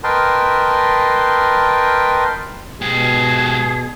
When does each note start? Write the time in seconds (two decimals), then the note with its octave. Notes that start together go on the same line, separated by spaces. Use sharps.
0.04 A#4 B4 D#5 G5 A5 C6
2.82 G#2 B2 G4 G#4